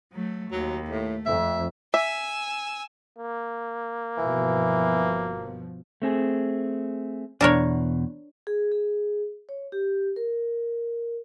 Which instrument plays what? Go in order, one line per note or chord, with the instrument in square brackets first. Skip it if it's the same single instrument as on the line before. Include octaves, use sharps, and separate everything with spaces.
[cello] F#3 A3
[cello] D#2 [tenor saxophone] F#3
[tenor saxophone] A2 [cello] A3
[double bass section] F2 [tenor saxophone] E5
[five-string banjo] E5 [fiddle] G#5 E6
[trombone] A#3
[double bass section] G1 B2 F3 [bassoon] E3
[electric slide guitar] A3 C4 G#4
[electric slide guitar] E2 B2 [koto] D4 A#4 C#5
[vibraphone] G#4
G#4
C#5
G4
A#4